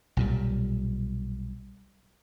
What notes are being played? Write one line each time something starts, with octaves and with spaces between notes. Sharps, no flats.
B1 A#2 G3